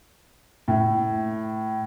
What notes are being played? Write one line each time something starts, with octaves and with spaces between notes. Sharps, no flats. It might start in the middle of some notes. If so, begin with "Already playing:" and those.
A2